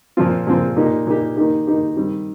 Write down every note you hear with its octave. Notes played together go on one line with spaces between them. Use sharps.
A#2 F3 C4 F4
A#2 F3 C4 F4
A#2 A#3 D#4 G4
A#2 A#3 D#4 G4
D#3 A#3 D#4 G4
D#3 A#3 D#4 G4
D#3 G3 C4